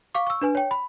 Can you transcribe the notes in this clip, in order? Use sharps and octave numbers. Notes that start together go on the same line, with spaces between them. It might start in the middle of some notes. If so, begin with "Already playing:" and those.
F5 C#6 D6
C#6 E6
D4 B4 G#5
C#5 G5
B5